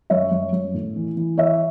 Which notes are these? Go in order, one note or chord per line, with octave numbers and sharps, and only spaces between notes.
F#2 C#5 E5
F#2
F#2
A2
E3
E3
E3 C#5 E5